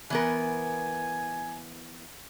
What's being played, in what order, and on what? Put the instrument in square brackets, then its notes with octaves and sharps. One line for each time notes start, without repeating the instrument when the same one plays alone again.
[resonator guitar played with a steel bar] E3 B3 A#4 [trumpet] G#5